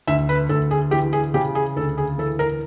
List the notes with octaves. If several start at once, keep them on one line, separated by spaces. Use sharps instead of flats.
D2 E5
B4
D2 A4
G#4
E3 G4
G#4
C#3 G4
G#4
D2 A4
G#4
E3 A4
A#4